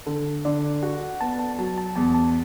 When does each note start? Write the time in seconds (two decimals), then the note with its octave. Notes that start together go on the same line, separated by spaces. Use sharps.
0.06 D3 A4
0.45 D3 D5
0.83 F#4 F#5
1.21 B3 A5
1.39 A5
1.58 F#3 A5
1.78 A5
1.96 E2 A5
2.14 A5